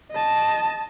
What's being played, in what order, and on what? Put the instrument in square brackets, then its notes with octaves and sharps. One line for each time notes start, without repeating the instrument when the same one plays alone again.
[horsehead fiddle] D#5 A5